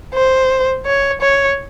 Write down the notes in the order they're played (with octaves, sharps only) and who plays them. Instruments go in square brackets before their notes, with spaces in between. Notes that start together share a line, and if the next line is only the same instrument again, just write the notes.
[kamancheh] C5
C#5
C#5